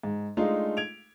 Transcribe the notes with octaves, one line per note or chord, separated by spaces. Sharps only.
G#2
G#3 A3 D4 D#4 F4
G#6 D7 F7